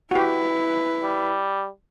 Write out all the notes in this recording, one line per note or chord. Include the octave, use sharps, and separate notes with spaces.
E4 F#4 G4 B4
G3